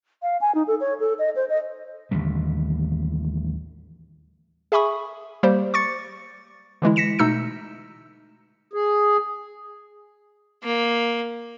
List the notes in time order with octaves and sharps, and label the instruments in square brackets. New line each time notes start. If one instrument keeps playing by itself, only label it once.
[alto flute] F5
G#5
D#4
A4
C#5
A4
D#5
C5
D#5
[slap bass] A1 D#2 D3 G3
[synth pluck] G#4 E5 G#5 B5 C#6 D#6
G3 A#3 G4 C5
C#6 D6 A6 C#7
D3 E3 G#3 E4
A#6 B6 C#7 E7
B2 A3 D#4 E6 G6 C#7
[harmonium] G#4
[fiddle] A#3